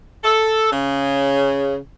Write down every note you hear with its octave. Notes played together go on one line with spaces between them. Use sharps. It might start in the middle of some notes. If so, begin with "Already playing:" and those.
A4
C#3